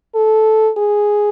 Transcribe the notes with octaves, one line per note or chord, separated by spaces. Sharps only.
A4
G#4